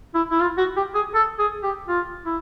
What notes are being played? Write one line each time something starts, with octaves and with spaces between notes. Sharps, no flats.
E4
E4
F4
F#4
G4
G#4
A4
G#4
G4
F4
E4